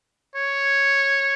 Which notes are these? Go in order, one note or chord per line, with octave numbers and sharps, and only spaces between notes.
C#5